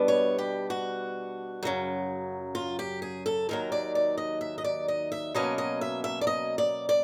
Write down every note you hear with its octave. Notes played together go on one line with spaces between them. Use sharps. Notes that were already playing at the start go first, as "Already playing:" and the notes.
Already playing: B2 G3 B3 D4
C#5
G4
F#4
F#2 C#3 F#3
F4
G4
G#4
A4
D#2 D#3 F#3 A#4
D5
D5
D#5
E5
D#5
D5
D#5
E5
B2 F#3 A#3 C#4 D#5
D#5
E5
E5
D5
D#5
D5
D5